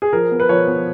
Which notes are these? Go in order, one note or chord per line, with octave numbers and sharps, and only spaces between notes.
G#4
F3 A#4
B3
B4
F3 C#5
B3